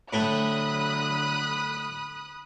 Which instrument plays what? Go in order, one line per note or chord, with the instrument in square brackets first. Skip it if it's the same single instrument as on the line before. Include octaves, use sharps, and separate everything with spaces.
[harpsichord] A2 A3 [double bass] D3 F#3 [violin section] B5 D#6 F#6